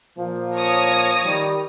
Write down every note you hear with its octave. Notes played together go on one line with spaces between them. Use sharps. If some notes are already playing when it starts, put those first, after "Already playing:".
A#2 F3
C#5 D#6 A#6
D#3 G3